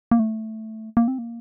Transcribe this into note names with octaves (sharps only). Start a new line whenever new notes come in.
A#3
A3
A#3
C4
A#3